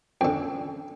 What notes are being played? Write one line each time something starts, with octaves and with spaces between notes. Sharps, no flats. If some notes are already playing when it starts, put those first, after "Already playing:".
F2 D3 C#4 G5